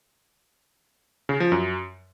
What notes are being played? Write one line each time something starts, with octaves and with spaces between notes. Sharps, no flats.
C#3
F3
F#2